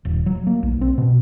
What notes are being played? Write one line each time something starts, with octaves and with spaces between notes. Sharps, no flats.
D#1
F#3
A#3
B1
C4
B2